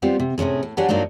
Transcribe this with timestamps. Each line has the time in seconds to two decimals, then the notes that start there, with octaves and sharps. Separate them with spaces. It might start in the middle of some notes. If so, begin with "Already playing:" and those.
0.02 G3 B3 C4 F4 G4
0.20 C3
0.38 A2 C3 D#3 C#4 G#4
0.63 A2
0.77 F#3 G3 D4 G4 F#5 G#5
0.89 G2 F#3 A#3 D4 D#4 F4